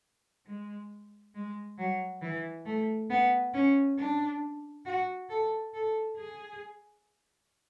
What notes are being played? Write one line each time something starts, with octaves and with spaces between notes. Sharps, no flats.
G#3
G#3
F#3
E3
A3
B3
C#4
D4
F#4
A4
A4
G#4